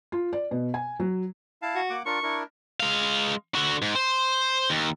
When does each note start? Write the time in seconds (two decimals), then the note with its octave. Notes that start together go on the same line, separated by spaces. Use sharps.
0.12 F4
0.33 D5
0.51 B2
0.74 G#5
1.00 F#3
1.62 E4 F5 A5
1.75 F#4
1.90 A#3 F#5 D6
2.06 D4 F4 A#4 C#6
2.23 D4 E4 A#4
2.80 G#3 F5
3.55 D3 F#4
3.82 G#2
3.95 C5
4.70 D#2